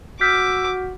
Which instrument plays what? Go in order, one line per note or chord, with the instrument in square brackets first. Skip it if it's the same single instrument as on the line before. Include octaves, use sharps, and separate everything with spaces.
[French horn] F#4 [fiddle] D6 [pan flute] E6 [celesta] F6 G6 B6